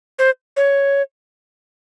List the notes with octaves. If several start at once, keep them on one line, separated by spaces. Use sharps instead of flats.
C5
C#5